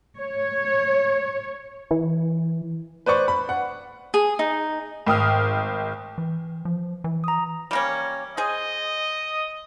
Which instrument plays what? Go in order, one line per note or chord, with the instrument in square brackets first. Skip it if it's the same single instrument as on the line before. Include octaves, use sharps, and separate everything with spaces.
[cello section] C#5
[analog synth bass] E3
[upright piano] B4 C5 D5 C#6
B5
F#5
[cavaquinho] G#4
D#4
[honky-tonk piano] G#1 G5 D#6 F6
[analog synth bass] E3
F3
E3
[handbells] A#5 D#6
[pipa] G3 A#3 C#4
[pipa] G#4 C5 [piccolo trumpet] D#5